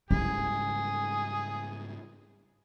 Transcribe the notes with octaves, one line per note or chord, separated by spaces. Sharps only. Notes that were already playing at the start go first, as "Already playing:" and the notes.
G#2 C#3 G3 E4 G#4